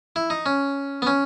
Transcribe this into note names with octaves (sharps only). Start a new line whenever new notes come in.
E4
D#4
C#4
B3
C#4